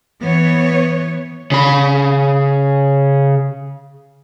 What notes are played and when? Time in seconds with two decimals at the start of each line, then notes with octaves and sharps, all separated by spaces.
0.21 E3 B3 C#5
1.51 C#3 B5